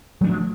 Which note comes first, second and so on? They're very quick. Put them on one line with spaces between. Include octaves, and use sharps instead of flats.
F#3 A3 D4 F3